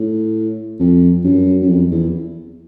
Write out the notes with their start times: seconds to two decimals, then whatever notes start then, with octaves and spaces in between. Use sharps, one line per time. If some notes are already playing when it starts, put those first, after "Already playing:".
Already playing: A2
0.79 F2
1.24 F#2
1.62 F#2
1.69 F2
1.91 E2